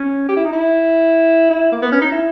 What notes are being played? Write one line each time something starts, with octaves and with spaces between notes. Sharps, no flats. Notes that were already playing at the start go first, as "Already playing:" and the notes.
Already playing: C#4
G4
E4
D#4
E4
E4
A#3
B3
C#4
D#4
E4